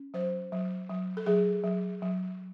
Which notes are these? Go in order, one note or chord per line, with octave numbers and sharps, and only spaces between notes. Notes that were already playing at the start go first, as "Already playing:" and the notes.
Already playing: C#4
F#3 C5
F#3
F#3
A4
F#3 G#4
F#3
F#3